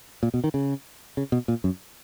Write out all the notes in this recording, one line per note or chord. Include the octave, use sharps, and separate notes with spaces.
A#2
B2
D#3
C#3
C#3
B2
A#2
F#2